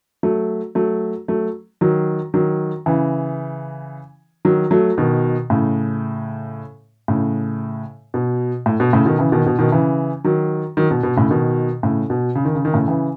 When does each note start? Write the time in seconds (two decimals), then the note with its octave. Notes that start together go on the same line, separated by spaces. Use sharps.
0.23 F#3 A3
0.75 F#3 A3
1.28 F#3 A3
1.81 D#3 F#3
2.34 D#3 F#3
2.86 C#3 E3
4.45 D#3 F#3
4.71 F#3 A3
4.98 B2 D#3
5.50 A2 C#3
7.08 A2 C#3
8.14 B2
8.66 A2
8.80 B2
8.93 A2 C#3
9.06 B2 D#3
9.19 C#3 E3
9.32 B2 D#3
9.46 B2
9.59 B2 D#3
9.72 C#3 E3
10.24 D#3 F#3
10.77 D#3 F#3
10.91 B2
11.03 B2
11.17 A2 C#3
11.30 B2 D#3
11.83 A2 C#3
12.10 B2
12.35 C#3
12.45 D#3
12.55 C#3
12.65 D#3
12.74 A2 C#3
12.88 C#3 E3